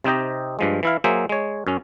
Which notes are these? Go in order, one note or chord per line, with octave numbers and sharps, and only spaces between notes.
C3 C4 D#4 G4 D#5
G2 F3 G#3
E3 E4 F5
F#3 A#3 G#4 C5 E5
G#3 C#5
F#2 C#4